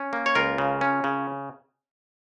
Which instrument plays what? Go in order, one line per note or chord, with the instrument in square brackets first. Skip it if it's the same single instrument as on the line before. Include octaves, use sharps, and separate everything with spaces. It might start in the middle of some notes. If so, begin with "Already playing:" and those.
Already playing: [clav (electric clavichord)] C#4
A#3
C#5
C#2 F4 A#4
C#3
C#4
C#3